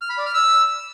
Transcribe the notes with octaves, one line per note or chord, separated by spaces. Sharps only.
F6
B5
D5
F6
E6